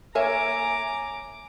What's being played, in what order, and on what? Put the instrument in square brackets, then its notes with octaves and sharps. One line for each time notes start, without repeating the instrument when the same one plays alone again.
[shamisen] A#3 C#5 E5 [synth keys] G#5 [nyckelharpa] A#5 D6